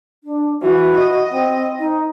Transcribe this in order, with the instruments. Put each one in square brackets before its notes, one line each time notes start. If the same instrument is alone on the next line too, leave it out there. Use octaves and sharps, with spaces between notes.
[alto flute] D4
[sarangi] E3 [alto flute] F#4
[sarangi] D#5
[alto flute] C4
D#4